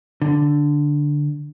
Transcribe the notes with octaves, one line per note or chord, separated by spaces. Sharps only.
D3